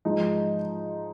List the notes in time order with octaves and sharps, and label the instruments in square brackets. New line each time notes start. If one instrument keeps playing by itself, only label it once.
[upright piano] G#2 F3 G#3 D#4